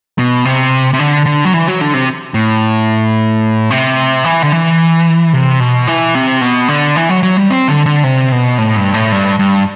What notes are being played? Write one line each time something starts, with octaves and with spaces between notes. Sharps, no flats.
B2
C3
C3
D3
D3
F#3
E3
F#3
D3
C3
A2
C3
E3
D3
E3
C3
B2
E3
C3
B2
D3
E3
F#3
F#3
G3
C4
D3
D3
C3
B2
A2
G2
A2
G2
G2